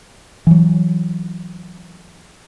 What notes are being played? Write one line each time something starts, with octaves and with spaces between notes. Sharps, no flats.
E3 F#3